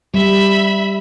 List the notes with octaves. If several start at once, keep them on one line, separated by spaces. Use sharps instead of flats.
G3 E5 B5